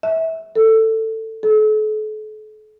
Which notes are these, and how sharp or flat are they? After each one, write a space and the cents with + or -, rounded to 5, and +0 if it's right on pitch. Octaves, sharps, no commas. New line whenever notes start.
E5 -25
A4 +15
A4 -40